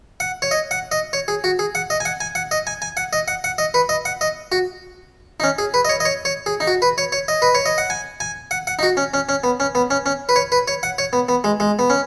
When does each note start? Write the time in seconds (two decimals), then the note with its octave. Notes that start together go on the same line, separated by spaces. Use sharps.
0.20 F#5
0.42 C#5
0.51 D#5
0.71 F#5
0.92 D#5
1.13 C#5
1.28 G#4
1.44 F#4
1.59 G#4
1.75 F#5
1.90 D#5
2.00 G#5
2.05 F#5
2.21 G#5
2.35 F#5
2.51 D#5
2.67 G#5
2.82 G#5
2.97 F#5
3.13 D#5
3.28 F#5
3.44 F#5
3.58 D#5
3.74 B4
3.89 D#5
4.05 F#5
4.21 D#5
4.52 F#4
5.40 D#4
5.44 C#4
5.58 G#4
5.74 B4
5.85 D#5
5.89 C#5
6.00 D#5
6.05 C#5
6.25 C#5
6.46 G#4
6.60 D#4
6.67 F#4
6.82 B4
6.98 C#5
7.12 C#5
7.28 D#5
7.42 B4
7.55 C#5
7.66 D#5
7.78 F#5
7.90 G#5
8.20 G#5
8.51 F#5
8.67 F#5
8.79 D#4
8.83 F#4
8.97 C#4
9.14 C#4
9.29 C#4
9.44 B3
9.60 C#4
9.75 B3
9.91 C#4
10.06 C#4
10.29 B4
10.36 C#5
10.52 B4
10.68 C#5
10.83 F#5
10.98 C#5
11.13 B3
11.29 B3
11.44 G#3
11.60 G#3
11.79 B3
11.90 C#4